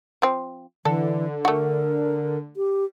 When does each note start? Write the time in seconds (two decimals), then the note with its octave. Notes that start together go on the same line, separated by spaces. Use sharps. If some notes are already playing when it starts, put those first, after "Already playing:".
0.22 F3 C4
0.85 D3 E3 A4
1.45 A3 F#4 A#4
2.57 G4